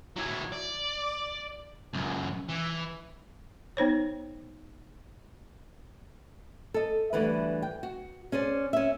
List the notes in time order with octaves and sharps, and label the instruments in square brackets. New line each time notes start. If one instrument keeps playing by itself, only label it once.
[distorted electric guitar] F#3 E4
D5
C#2 F#2
E3
[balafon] B3 D#4 C5 C#5
[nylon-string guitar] A4 D#5
D2 D3 E3 G3 B4
G5
F#4
C#4 G#4 C5 D5
C#4 E5